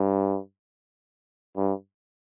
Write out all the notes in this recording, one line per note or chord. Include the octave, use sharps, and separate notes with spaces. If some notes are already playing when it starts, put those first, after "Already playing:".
Already playing: G2
G2